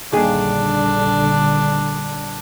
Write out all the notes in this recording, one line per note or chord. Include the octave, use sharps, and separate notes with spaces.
A#1 D#2 D3 G3 D4 G#4